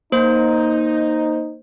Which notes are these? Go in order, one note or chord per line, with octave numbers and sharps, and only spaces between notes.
A#3 D#4 C5